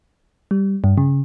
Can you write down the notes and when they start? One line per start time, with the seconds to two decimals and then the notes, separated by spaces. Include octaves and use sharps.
0.51 G3
0.84 G2
0.98 C#3